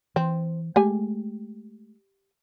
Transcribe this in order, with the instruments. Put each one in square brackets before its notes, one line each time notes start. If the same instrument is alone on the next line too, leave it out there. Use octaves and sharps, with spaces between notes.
[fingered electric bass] E3 [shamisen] C4
[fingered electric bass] G#3 A3 [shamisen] G4 G#5